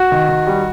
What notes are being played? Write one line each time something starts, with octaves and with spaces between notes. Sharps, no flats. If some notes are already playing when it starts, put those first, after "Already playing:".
Already playing: F#4
D#3
D#3
G3